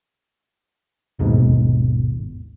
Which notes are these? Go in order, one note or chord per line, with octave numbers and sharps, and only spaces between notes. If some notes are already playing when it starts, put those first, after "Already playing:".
G#1 D#2 G#2 B2